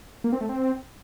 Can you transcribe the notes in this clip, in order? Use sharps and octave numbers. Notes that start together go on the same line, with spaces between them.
A#3
C4
A3
C4